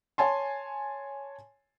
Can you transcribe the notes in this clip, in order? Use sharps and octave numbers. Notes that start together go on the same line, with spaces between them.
C#5 G#5 A5 C6